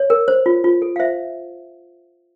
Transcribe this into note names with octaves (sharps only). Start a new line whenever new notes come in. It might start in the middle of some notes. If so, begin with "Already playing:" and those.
Already playing: C#5
A#4
C5
F4
F4
A4
F5
C5 E5